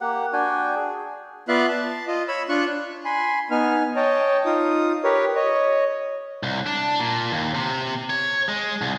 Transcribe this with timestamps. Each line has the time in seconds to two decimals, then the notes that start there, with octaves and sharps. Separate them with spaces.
0.01 A#3 G4 F#5
0.33 D4 F#4 G5 G#5
0.76 G#4
1.48 B3 F4 D5 E5 F5 F#6
1.69 A5
2.07 F4 D#5
2.28 C#5 B5 E6
2.49 D4 F4 C#6 F#6
3.05 G#5 B5 C6
3.51 B3 D#4 G#5 F6
3.96 C#5 D#5 G5 A5
4.45 D#4 F4 D#6
5.04 G4 A#4 B4 C#5
5.36 C#5 D#5
6.43 C2
6.66 D4
7.00 A#2
7.32 D#2
7.55 C3
8.10 C#5
8.49 G#3
8.82 C2